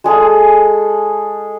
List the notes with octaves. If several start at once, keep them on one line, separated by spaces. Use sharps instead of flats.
G#3 G#4 A4